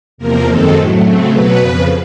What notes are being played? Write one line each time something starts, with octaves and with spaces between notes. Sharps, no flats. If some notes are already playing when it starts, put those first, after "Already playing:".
E2 C3 F3 A#3 A#4
F#2 D#3 G#3 C4 A4
A2 F#3 A3
C#3 F#3 A3 C4
B2 F#3 B3 B4
F2 C#3 F3